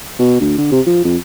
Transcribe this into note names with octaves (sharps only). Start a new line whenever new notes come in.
B2
D2
D3
C3
F3
F2